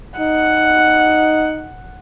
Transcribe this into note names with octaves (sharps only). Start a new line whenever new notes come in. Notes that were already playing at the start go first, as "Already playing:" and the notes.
D#4 F#5